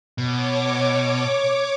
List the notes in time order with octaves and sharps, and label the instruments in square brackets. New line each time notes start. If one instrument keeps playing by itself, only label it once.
[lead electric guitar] B2 [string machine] C#5 D6